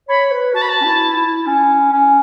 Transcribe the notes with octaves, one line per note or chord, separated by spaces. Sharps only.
C#5 B5
B4
F#4 A5
B5
A5
C#4
E4
E4
C#4
C#4